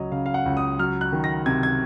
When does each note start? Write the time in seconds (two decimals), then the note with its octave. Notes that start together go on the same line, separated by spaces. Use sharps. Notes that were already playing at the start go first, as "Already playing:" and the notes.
Already playing: C#2 F#3 C#5 D#5
0.12 C#3 F5
0.26 F5
0.34 F#5
0.46 C#2
0.57 D#6
0.79 F#3 F6
1.01 F#6
1.13 D#3
1.24 A#6
1.46 C3 G#6
1.63 G#6